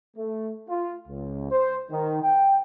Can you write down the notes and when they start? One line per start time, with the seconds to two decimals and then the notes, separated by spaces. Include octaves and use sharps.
0.17 A3
0.68 F4
1.08 C#2
1.51 C5
1.91 D#3
2.23 G5